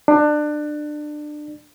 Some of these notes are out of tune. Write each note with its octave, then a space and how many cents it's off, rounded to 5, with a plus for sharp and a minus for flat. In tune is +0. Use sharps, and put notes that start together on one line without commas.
D4 +25